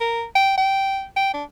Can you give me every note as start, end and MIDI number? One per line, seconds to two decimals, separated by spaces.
0.01 0.24 70
0.35 0.55 79
0.58 1.05 79
1.16 1.33 79
1.34 1.44 62